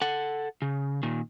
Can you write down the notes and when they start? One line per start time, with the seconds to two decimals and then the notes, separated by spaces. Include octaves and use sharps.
0.02 A4 F#5
0.62 C#3
1.03 A#2 D#3